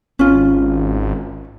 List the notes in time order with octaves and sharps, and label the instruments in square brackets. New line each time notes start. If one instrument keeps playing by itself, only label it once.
[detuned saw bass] G#1 [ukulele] C#4 F4